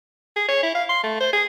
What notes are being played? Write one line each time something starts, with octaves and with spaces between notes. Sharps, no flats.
G#4
C#5
E4
F5
C6
A3
C5
G#4